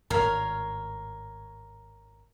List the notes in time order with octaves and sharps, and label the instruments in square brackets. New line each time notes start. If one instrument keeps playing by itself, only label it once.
[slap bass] G#1 A2 [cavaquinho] A#4 C#5 F5